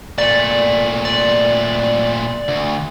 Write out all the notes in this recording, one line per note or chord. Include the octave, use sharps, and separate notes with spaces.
A#2 A3 D5
D5
D2